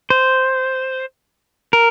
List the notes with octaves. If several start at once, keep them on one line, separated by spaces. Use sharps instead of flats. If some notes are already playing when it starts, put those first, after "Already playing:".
C5
A#4